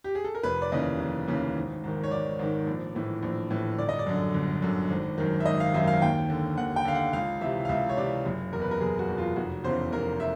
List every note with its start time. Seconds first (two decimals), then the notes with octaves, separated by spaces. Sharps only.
0.04 G4
0.15 G#4
0.24 A4
0.35 A#4
0.43 F1 B4
0.62 D5
0.72 D#2 C#3 E3 D#5
0.99 F1
1.28 D#2 C#3 E3
1.56 G#1
1.84 G#2 D#3
2.04 C#5
2.11 G#1 D5
2.39 G#2 D#3
2.67 A#1
2.95 A2 E3
3.23 A#1
3.50 A2 E3
3.78 G1 D5
3.89 D#5
3.99 D5
4.06 F#2 D3
4.34 G1
4.62 F#2 D3
4.90 G#1
5.18 F#2 D#3
5.40 E5
5.45 G#1 D#5
5.60 F5
5.74 F#2 D#3 E5
5.87 F5
6.02 D#2 G5
6.30 D3
6.57 D#2 F#5
6.76 G5
6.85 D3 F5
6.95 F#5
7.13 C#2 F5
7.41 C3 E3 E5
7.65 F5
7.69 C#2 E5
7.89 C#5
7.97 C3 E3 D5
8.25 F#1
8.53 E2 B2 A#4
8.62 B4
8.71 A#4
8.81 F#1 G#4
8.99 F#4
9.09 E2 B2
9.18 F4
9.36 F1 F#4
9.64 E2 C#3 E3 C5
9.92 F1 A#4
10.20 E5